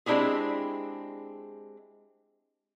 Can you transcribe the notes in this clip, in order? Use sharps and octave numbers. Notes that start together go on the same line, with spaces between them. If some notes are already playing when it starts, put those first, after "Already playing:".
G#3 C4 D4 E4 G4 G#4